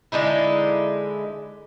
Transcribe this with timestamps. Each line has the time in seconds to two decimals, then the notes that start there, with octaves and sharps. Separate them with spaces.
0.12 D3 G#3 D#4 E4